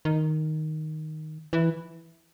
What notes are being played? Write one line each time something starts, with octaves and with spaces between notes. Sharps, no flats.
D#3
E3